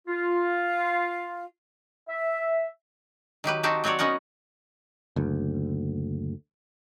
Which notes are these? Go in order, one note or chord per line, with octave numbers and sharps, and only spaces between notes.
F4
E5
D#3 F#3 G4 B4
C4 D#4 F#4 G4 A5
F#3 C4 F#4 C#5 D5
B3 C#4 D#4 A#4 F#5
F#1 D2